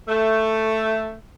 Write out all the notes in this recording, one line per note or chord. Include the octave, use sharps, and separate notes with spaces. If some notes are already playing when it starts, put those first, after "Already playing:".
A3